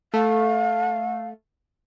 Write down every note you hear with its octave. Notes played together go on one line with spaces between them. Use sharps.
A3 F5